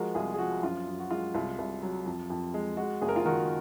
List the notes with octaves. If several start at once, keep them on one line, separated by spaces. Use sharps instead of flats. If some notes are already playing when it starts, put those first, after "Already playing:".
Already playing: F3 G#3 F#4 A#4
C2 F4 G#4
G#4
F3 F#4
F#2 F4
F#2
F#4
G#3 F4
C2 F4
C2
F#3
F2
F2
G#3
G#3 F#4
F#1 G#4
A#4
F4 G#4
D#3 F#4 A#4